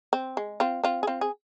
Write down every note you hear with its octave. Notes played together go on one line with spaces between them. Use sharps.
C4
G#3
C4 F4
C4 F4
G#4
C4 F4
G#4